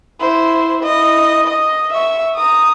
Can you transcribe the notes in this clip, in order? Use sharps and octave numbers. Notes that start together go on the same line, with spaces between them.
E4 C5
E4 D#5
D#5
E5 C#6
A#5 D#6